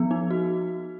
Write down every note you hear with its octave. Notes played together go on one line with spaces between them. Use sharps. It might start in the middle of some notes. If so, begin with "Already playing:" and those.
Already playing: F3 B3 D#4
D#4
F#4